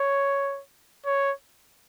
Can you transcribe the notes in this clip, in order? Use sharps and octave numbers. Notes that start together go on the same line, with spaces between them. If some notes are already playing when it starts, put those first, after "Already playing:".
Already playing: C#5
C#5